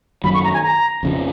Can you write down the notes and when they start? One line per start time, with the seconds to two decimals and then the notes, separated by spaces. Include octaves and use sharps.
0.24 F#2 D#3 F#3 A#3 B5
0.34 C#6
0.44 A#5
0.53 G#5
0.63 A#5
1.03 F2 C#3 F3